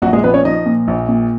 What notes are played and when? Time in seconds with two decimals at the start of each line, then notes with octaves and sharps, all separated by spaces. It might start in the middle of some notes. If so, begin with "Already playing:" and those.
0.02 A#1 F#3 F#4
0.13 G#3 G#4
0.24 F3 B3 B4
0.34 C#4 C#5
0.44 F3 D#4 D#5
0.66 A#2
0.88 A#1
1.09 A#2